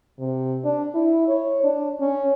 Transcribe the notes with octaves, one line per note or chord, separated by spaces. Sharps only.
C3
D4
E4
C#5
D4
C#4